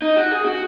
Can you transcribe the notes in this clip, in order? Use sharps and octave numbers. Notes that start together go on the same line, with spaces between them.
D#4
F#4
G#4
F#4